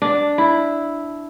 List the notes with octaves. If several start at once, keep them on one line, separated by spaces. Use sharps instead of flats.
D4
E4